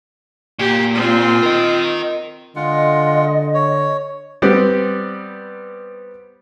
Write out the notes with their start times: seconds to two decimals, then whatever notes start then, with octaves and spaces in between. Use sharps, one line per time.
0.59 A#2 G4
0.95 C4 F4
1.43 A#4 D#5
2.56 D3 G#3 F4 D#5 F#5
3.54 C#5
4.42 G3 B3 C4 G4